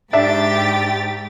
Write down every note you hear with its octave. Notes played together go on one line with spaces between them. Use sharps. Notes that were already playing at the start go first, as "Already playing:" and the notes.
G#2 D4 G4 E5 A6